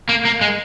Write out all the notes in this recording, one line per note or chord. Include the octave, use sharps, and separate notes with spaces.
A#3
A#3
G#3